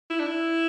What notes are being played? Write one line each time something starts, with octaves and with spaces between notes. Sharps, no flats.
E4
D4
E4